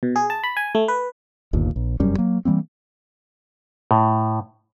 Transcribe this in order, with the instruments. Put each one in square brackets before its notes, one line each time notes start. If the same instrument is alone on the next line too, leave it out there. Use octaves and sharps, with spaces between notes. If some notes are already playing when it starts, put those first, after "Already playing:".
[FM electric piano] B2
G#4
A5
B5
G#5
A3
B4
[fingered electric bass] G1 D#2 A#2
A#1
F1 F#2 G3 C#4
F#3 A#3
E3 G3 A#3 C4
[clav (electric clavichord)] A2